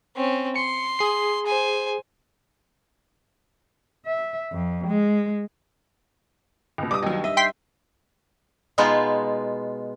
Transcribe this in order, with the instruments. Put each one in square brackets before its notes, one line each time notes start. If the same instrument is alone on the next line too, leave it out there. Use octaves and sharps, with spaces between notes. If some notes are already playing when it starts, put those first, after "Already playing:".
[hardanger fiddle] C4 C#4
[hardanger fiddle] C6 [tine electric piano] C#7
[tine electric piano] G#4 C7
[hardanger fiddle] C5 G#5
[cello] E5
F2
G#3
[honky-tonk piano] C#2 B2
[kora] G2 [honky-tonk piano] D6 D#6
[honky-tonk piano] D#2 F#3 [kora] D#4 F5
[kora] D#5 [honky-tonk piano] E5
[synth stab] G5 C6 B6
[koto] B2 G#3 B3 D#4 F4